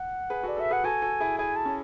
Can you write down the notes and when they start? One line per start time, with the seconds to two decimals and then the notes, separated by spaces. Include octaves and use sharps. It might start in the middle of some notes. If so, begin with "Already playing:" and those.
Already playing: F#5
0.30 G#4 B4
0.43 F#4 A4
0.48 D5
0.57 F#4 A4 E5
0.71 G#4 B4 F#5
0.84 F#4 A4 G#5
1.02 F#4 A4
1.20 E4 G#4
1.38 E4 G#4 G#5
1.56 A5
1.65 C#4